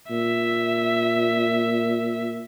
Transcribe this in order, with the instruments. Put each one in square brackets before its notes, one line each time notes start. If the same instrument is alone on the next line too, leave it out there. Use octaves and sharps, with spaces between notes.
[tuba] A#2 [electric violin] E5